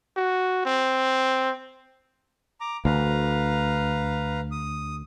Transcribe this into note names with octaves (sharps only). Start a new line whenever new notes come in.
F#4
C4
A#5 D6
D2 B4 F5 A#5
D#6